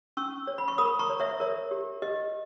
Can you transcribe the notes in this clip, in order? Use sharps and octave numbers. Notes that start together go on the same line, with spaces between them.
C#4 C#6 E6
C#5
B5
C#6
A#4 B5 D#6
A#5 C#6
C#5
C#5 E5
A#4 C#5
G4
G4 D#5